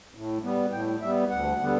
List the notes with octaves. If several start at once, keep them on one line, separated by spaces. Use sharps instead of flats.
A2
G3 B3
A2 G5
G3 B3 E5
D2 F#5
D3 G3 B3